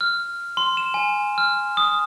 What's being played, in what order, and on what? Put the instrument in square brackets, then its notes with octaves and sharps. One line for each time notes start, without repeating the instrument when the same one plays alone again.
[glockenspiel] F6
C6
E7
G#5
F6
D#6